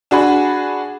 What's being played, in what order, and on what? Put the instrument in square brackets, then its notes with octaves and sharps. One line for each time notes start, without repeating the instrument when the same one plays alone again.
[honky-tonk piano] D4 F#4 G#4 B5